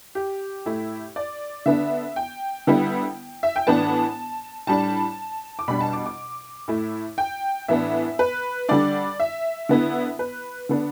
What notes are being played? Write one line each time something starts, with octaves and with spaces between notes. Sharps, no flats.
G4
A2 A3 E4
D5
D3 B3 D4 E5
G5
D3 G3 B3 E4
E5
G5
A2 E3 B3 D4 A5
A2 G3 D4 A5
D6
B2 G3 D4 B5
A5
D6
D6
A2 A3 E4
G5
A2 E3 B3 D4 E5
B4
D3 G3 D4 D5
E5
D3 B3 E4
B4
D3 B3 D4